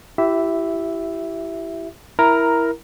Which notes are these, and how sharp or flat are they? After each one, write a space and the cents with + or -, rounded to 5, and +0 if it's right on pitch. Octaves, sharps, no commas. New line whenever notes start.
E4 +15 G4 -20 E5 +0
E4 +0 A#4 +5 A#5 +0